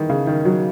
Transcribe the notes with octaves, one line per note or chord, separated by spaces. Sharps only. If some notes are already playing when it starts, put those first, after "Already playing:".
Already playing: D#3 E3
C#3
D#3
F#3